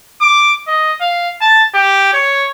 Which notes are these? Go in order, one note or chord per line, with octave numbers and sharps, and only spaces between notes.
D6
D#5
F5
A5
G4
C#5